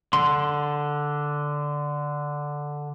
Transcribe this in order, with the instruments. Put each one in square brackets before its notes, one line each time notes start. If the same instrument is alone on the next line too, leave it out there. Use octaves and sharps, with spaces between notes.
[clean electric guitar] D3 [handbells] C6